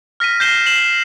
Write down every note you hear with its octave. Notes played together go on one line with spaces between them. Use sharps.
F6 A#6 B6 D#7
G6 A#6 C7 E7 G7
C7 E7 F#7